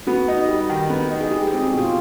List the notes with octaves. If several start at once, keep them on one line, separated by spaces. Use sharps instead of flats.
B3 F#4
D#4
G3
D#3
B3
D#4
G#4
G#3 G4
G#4
C4
G4
B2 F4